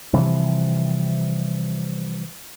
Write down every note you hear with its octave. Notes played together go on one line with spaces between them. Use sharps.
C3 E3 F3 G3